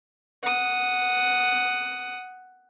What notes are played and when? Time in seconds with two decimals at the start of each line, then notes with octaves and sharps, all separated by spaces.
0.43 F#5 D#6